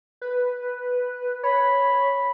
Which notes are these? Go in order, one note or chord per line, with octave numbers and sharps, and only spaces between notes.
B4
C#5 B5